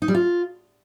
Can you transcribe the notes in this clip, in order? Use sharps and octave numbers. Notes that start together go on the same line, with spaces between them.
D#4
G3
F4